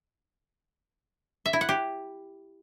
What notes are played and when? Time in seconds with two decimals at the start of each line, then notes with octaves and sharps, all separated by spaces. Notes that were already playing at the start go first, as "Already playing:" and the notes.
1.46 E5
1.53 E4
1.61 F#5
1.69 G4